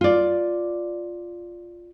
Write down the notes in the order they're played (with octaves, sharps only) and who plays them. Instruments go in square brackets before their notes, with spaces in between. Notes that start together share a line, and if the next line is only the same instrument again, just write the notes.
[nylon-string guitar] F4 D5